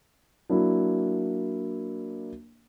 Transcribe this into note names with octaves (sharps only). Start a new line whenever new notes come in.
F#3 A#3 D4 E4